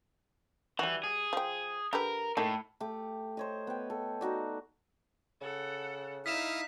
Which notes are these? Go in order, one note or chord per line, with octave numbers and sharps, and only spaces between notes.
E3 G3 F#4
G#4
F3 G5
D3 G4 A#4 B4
A2 A#3 D#4 A4
A3 G4 D6
C5 C#5 D#5
B3 G5
A4
D#4 F#4 D5
C#3 A4 F#5
D#4 E4 F5 D#6 F6 B6 E7